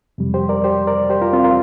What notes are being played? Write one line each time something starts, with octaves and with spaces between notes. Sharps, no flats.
F2 C3 G3
G4 C5
A#4 D5
G4 C5
A#4 D5
G4 C5
F4 A#4
C4 F4
F4 A#4